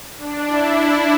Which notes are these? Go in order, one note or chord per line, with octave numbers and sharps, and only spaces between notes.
D4
E4